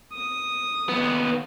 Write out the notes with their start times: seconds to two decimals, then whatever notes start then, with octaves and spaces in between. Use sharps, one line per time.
0.13 D#6
0.89 D#2 B3